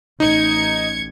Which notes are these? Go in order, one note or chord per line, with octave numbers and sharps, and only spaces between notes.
A1 D#4 G#6 C#7